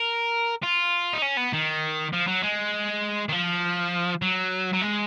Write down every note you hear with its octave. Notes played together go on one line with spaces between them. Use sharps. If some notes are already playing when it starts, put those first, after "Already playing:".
Already playing: A#4
F4
D#4
C#4
B3
D#3
F3
F#3
G#3
D#3
F3
F#3
F#3
G#3